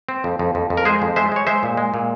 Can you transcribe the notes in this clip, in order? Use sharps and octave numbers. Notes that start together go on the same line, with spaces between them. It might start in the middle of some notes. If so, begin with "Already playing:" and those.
C4
F2
F2
F2
F2
A#4
G#3 G#4 C5
F2
G#3 C5 E5
G#3 C#5
G#3 C5 E5
A#2
G#3
A#2